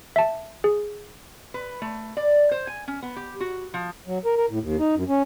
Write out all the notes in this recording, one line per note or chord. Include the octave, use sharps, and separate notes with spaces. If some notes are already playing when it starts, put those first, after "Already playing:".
E5 A5
G#4
B4
A3
D5
C5
G#5
C#4
B3
G4
F#4
F3
F#3
A#4
A#4
A2
D#2
D#4
F#2
C#4